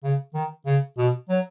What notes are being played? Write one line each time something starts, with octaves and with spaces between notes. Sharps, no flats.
C#3
D#3
C#3
B2
F#3